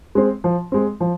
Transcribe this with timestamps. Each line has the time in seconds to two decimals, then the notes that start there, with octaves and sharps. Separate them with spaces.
0.15 G#3 C4
0.44 F3
0.72 G#3 C4
1.00 F3